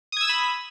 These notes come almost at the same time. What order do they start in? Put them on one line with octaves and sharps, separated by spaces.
D#6 G#6 E6 E7 B5